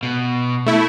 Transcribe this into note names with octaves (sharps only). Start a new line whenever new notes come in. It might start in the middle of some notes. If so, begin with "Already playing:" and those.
B2
A3 E4